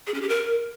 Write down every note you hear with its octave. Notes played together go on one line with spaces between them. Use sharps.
G#4
C#4
G4
A#4